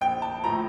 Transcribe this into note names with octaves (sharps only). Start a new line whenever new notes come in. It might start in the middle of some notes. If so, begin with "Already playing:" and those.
A#1 G5
A5
A2 F3 A3 A#5